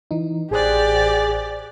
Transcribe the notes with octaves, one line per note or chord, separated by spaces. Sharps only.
E3 D#4
A1 G4 G#4 C5 D5 F#6